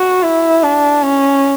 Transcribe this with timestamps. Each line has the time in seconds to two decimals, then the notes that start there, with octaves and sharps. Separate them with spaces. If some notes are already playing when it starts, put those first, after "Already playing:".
Already playing: F#4
0.23 E4
0.63 D4
1.05 C#4